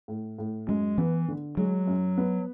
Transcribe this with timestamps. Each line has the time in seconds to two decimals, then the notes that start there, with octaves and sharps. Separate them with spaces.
0.08 A2
0.38 A2
0.68 F#2 G#3
0.98 E3 B3
1.28 D3
1.57 F#3 G#3
1.87 F#2
2.18 B3